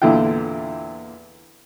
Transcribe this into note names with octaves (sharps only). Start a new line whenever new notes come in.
E2 A#2 D3 E4 F4 G5